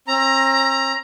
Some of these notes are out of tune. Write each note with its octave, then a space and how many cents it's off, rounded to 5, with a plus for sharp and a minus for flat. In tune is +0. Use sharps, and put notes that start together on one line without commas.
C4 +45 A#5 +5